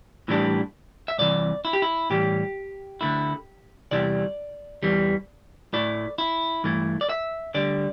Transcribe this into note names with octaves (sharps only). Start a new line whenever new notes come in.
A2 E3 G3 D4
E5
C2 C3 E3 D5
E4
G4
E4
A2 E3 G3 G4
D2 D3 A3 E4
E2 C3 G3 E4 D5
E2 E3 G3
A2 A3 E4 D5
E4
G2 E3 A3 E4
D5
E5
D2 D3 G3 D5